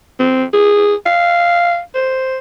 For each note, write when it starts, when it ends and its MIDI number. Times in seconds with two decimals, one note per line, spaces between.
0.20 0.44 60
0.53 0.94 68
1.06 1.80 77
1.95 2.39 72